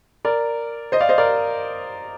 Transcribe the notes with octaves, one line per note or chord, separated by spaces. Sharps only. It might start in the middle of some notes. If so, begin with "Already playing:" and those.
A#4 D5
C5 D#5
D5 F5
C5 D#5
A#4 D5